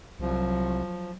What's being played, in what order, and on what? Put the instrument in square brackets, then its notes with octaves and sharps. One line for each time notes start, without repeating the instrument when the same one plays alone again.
[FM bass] C2 [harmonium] F3 [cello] F#3